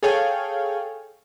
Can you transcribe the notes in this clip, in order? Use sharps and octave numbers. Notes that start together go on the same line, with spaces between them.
G#4 A4 C#5 F5 G5 G#5